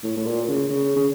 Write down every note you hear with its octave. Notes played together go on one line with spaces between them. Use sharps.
A2
A2
A#2
C#3
C#3
C#3